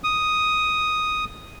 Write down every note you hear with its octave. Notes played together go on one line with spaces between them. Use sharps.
D#6